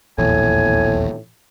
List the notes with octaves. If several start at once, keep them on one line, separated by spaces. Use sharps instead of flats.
D#1 A#1 E2 A2 G#5